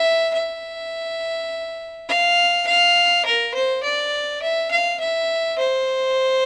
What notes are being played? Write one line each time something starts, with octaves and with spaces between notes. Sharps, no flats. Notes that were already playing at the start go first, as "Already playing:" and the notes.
Already playing: E5
E5
F5
F5
A#4
C5
D5
E5
F5
E5
C5